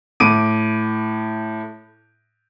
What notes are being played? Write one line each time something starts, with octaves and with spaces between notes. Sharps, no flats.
A2 D6 D7 D#7